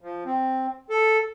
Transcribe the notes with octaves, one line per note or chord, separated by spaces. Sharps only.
F3
C4
A4